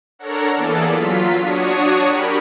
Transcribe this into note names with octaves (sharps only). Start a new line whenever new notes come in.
D4 A4 A#4 C#5 F#5 A#5
E3 A#3 B3 G#4 A4 D5
F#3 F4 B6
D4 F#4 C#5 C#6 D#6
G4 A#4 B5